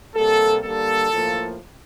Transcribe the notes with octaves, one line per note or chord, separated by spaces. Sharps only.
C3 G3 A#3 A4
D3 G3 A#3 A4
A2 F3 A#3